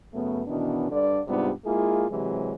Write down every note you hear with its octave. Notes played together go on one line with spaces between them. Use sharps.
F#2 C#3 A3 B3
B2 D#3 E3 B3 C#4 D4
G2 D3 D5
G#2 C3 G3 B3 D4 F4
G#3 A#3 E4 F4 G#4
C3 E3 F#3 G#3 C4 G4